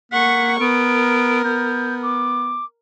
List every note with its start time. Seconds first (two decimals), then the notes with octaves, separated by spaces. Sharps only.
0.12 A#3 F#5 C#6 B6
0.60 B3 A#4 D7
1.44 B3 G6
2.03 D6